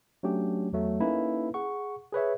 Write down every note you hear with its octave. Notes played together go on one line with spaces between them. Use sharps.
F#3 A3 C#4 D4 G4
E2 F#3 A3
A#3 C#4 D#4 E4 A4 B4
G#4 F#5 C#6
G#4 B4 C#5 E5